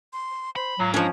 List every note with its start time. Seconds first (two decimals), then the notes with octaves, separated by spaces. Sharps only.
0.13 C6
0.56 C5 B5
0.79 G#2 F#3 F4
0.94 F3 C#4 D4